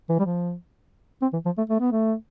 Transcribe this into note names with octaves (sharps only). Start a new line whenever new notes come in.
E3
G3
F3
C4
E3
F3
A3
A3
B3
A3